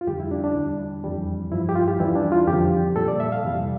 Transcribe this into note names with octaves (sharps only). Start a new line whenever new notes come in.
F4
F2 D3 G3 G4
E4
D4
D4
E2 D3 G3
F2 E3 G3
G2 F3 E4
G4
F4
G4
E2 E3 G3 E4
D4
F4
F2 D3 F3 G4
A#2 G3 A4
D5
E5
F5
F2 C3 E3 G3